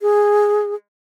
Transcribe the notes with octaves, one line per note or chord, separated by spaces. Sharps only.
G#4